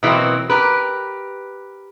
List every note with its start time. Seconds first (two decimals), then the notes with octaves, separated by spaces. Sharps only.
0.03 B2 E3 F#3 A#3 C4
0.50 G4 A#4 B4